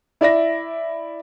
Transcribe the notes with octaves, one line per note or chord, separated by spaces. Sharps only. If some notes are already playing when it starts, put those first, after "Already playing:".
E4 D5 E5 A#6